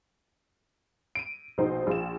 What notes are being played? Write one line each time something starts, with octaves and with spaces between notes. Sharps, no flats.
D7 D#7
A#1 B2 D#4 C5
A#1 F4 E7